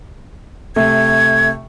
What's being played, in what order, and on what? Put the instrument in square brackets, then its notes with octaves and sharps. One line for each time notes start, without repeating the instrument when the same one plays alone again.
[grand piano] C3 A3 [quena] G#6